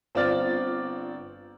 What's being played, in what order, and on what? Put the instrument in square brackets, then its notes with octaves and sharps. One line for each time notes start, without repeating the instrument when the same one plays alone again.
[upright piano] G1 C4 F4 D5 F6 A6